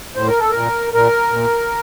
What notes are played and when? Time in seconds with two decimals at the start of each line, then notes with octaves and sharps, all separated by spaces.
0.16 A2 C5
0.28 A#4
0.40 A4
0.51 A#2 A#4
0.94 A#2 A#4
1.32 A#2